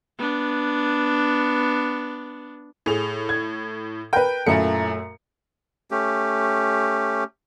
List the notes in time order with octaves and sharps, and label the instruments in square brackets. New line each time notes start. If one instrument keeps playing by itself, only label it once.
[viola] B3 D4
[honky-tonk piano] A2 F7 [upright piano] G#4
[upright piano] G#6
[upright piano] A#4 B4 [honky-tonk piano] G5
[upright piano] F#2 A3 [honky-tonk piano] A#2 E4 C#7
[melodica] A3 C#4 G4